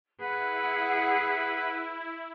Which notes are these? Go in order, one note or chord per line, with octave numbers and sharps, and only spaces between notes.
E4 G#4 B4 F#5